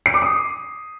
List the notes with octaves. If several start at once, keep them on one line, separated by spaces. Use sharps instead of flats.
C7
D6
D#6